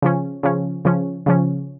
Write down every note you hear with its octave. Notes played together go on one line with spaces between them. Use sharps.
C#3 F3 C#4
C#3 F3 C#4
C#3 F3 C#4
C#3 F3 C#4